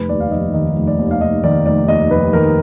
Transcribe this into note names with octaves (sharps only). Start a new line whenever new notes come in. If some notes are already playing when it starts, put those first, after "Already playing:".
Already playing: F1 B4
D#2 D5
F5
F1 D#5
D#3 D#5
F1
D5
D#2
F5
F1 D#5
D#3 D5
F1 D5
D#2 D#5
F1 B4
D#3 A#4